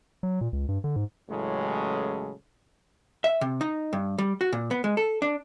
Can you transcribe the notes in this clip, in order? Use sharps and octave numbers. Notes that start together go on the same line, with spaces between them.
F#3
A#2
C#2
G2
D3
G#2
A1 A2 C#3 F#3 G#3 A4
E5
C3
D#4
G2
G3
F#4
A#2
B3
G#3
A4
D4